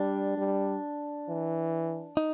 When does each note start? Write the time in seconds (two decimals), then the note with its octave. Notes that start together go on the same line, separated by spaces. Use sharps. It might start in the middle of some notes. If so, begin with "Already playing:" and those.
Already playing: G3 D4
0.37 G3
1.28 E3
2.17 D#4